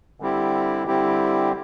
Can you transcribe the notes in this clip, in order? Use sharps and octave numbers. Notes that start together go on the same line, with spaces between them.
D3 G3 C4 E4 G4
D3 G3 C4 E4 G4